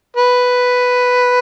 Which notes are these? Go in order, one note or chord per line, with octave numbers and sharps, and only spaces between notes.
B4